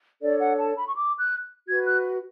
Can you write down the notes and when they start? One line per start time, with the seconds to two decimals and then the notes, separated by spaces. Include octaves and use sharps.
0.22 D4 A4 C#5 D5
0.40 F#5
0.58 A5
0.76 B5
0.86 C#6
0.95 D6
1.18 F#6
1.67 F#4 B4 G#6
1.85 F#6